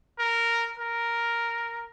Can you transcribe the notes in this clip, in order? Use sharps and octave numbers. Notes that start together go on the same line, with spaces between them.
A#4
A#4